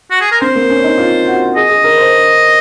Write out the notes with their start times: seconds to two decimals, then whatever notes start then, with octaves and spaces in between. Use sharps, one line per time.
0.11 F#4
0.21 G#4
0.31 A#4
0.41 C4 C5
0.55 A#3
0.70 C#4
0.84 D#4
0.98 F4
1.27 F#4
1.55 G#4 D#5
1.70 G#4
1.84 A#4
1.98 C5